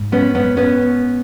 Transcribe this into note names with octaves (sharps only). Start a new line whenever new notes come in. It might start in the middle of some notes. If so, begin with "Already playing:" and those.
Already playing: G#2
B3 C#4
B3 C#4
B3 C#4